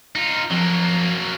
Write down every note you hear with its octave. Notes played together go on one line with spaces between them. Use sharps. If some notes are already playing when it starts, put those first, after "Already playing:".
D#4 F4
F2 F#3 A#3